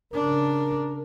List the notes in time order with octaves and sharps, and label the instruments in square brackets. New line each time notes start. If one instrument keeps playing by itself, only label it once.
[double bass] C#3 D4 [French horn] A#4